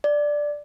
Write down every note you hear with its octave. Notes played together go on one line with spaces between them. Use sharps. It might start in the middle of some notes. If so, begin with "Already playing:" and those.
D5